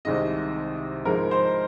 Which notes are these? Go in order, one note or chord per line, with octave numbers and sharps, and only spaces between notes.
C2 C3 D#3 G#3 D#5
G#2 F3 G#3 A#4
C5